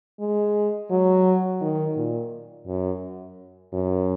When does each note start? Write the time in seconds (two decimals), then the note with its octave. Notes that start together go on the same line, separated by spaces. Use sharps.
0.20 G#3
0.90 F#3
1.61 D#3
1.96 A#2
2.66 F#2
3.73 F#2